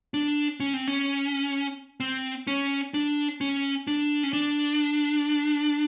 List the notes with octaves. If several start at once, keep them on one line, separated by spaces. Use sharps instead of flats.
D4
C#4
C4
C#4
C4
C#4
D4
C#4
D4
C#4
D4